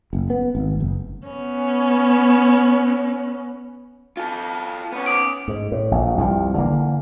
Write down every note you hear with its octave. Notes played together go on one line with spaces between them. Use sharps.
F#1
B3
G#1
F#1
B3 C#4
F4 A4
B3 C#4
D6 D#6 D7
G#2
A2
A#1
C2 G2 D3 F3
D3 E3 A#3